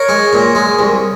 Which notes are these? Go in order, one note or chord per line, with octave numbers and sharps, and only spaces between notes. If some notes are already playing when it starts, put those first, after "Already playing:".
Already playing: A#4 C#5
G#3
A#2
G#3
C2